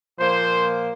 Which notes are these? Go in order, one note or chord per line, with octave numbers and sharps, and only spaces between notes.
A#2 F3 A#3 C5